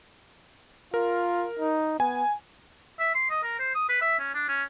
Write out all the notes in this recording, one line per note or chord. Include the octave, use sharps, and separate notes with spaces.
F4 A#4
D#4
B3 G#5
E5
C6
D#5
A#4
C5
D#6
B4
E5
C#4
D4
C#4